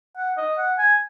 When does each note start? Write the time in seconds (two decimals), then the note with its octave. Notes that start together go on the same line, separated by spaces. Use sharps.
0.17 F#5
0.37 D#5
0.58 F#5
0.78 G#5